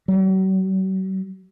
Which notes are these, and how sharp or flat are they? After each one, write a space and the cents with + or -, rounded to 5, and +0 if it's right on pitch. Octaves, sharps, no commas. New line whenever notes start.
F#3 +45